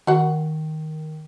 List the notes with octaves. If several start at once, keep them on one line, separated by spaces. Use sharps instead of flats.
D#3 F#4 F#5